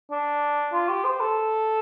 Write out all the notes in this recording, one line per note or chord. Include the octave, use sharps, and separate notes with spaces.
D4
F4
G4
C5
A4